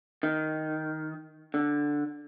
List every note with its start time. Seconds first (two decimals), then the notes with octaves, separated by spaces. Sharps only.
0.23 D#3
1.54 D3